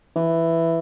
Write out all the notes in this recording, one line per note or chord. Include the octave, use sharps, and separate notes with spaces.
E3